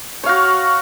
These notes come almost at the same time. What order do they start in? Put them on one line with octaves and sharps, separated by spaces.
C#5 F5 F#4